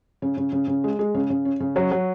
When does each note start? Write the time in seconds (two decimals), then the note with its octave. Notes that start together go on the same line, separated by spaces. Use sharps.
0.22 C#3
0.37 C#3
0.52 C#3
0.68 C#3
0.84 G#3
0.99 G#3
1.14 C#3
1.30 C#3
1.45 C#4
1.60 C#3
1.76 F#3
1.91 F#3